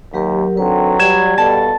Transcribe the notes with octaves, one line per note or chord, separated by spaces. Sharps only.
D#2 F#3 G4 A#4
D3 D#3 F#3 C4 B4
G3 G#6 E7
B2 A4 D5 F5 A5